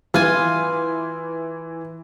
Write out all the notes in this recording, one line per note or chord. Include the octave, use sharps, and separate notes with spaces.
E3 F4 G#5